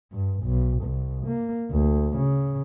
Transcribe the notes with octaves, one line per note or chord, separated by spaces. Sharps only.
G2
B1
C2
A#3
D2
C#3